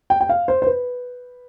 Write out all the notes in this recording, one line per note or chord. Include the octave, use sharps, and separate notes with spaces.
G5
G5
F5
C5
C5
B4